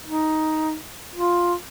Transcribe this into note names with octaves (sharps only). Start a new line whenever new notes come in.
D#4
F4